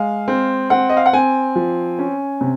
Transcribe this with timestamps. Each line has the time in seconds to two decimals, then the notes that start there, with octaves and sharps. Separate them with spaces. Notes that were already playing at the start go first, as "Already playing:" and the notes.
Already playing: G#3 F5
0.28 C4
0.70 C4 F#5
0.89 D#5
0.97 F5
1.06 F#5
1.13 C4 G#5
1.55 F3
1.99 C#4
2.41 C3